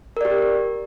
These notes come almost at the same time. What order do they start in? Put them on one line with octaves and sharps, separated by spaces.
A#4 D5 G4